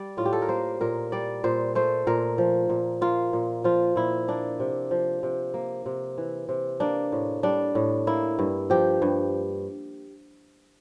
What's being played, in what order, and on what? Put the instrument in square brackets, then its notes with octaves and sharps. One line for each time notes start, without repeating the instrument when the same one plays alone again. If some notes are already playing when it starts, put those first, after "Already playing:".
Already playing: [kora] G3 D5
A2 F4
G4
A4
A#4
A#3 C5
A#2 A#4
G3 D5
A#2 C5
A3 C5
A#2 A#4
F3
A#2
A#3 F4
A#2
F3 F4
A#2 E4
A#3 D4
C3
F3
C3
A#3
C3
E3
C3
A#3 D4
A2
G3 D4
A2
A#3 E4
G2
F3 G4
G2